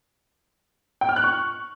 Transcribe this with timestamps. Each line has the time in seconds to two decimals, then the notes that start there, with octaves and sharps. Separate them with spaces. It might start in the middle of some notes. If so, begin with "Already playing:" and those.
1.01 G5
1.09 F6
1.16 F#6
1.24 C#6